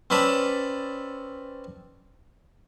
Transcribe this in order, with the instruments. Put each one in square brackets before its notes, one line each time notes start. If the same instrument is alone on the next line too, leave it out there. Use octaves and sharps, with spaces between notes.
[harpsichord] C4 C#4 B4 D5 A5